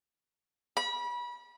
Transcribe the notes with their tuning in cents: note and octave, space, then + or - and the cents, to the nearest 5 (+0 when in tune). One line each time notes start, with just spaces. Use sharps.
B5 -30